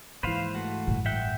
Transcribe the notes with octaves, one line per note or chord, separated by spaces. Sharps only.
G#2 E3 A#3 B4 C5 F5
A3 F#4
A1 G2
E5 F#5 G5